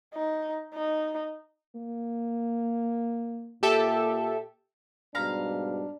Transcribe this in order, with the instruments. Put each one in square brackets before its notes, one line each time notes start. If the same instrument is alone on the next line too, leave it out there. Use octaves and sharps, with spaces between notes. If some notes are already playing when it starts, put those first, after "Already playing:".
[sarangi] D#4
D#4
[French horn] A#3
[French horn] A#2 [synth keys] G4 A4 E5
[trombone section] G#2 B2 G3 [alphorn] D4 [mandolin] F5 A#5 B5